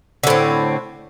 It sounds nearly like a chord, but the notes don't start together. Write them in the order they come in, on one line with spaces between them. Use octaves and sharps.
D3 A2 C4